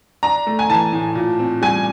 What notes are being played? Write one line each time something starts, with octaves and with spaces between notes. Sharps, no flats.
D4 A#5
A3
G#5
E3 A5
A2
A#2
C4
G3 G#5